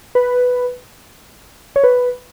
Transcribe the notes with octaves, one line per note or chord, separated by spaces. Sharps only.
B4
C#5
B4